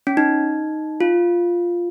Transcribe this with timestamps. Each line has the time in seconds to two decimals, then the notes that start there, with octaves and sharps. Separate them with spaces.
0.07 C#4
0.17 D#4
1.00 F4